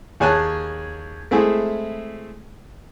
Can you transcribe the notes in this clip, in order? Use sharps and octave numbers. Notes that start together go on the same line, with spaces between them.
D#2 G#4 C#5 G#5 A5 F#6
G#3 A3 C4 E4 G#4